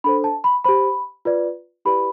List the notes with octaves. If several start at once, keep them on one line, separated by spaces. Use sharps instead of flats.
D4 A4 C5 B5
A5
B5
G4 C5 B5
F4 B4 D5
E4 G4 B4 D5 B5